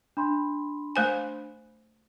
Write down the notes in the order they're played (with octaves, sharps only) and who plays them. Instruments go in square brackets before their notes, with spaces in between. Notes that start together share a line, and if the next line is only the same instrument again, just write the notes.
[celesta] D4 B5 C6
[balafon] A3 C5 G#5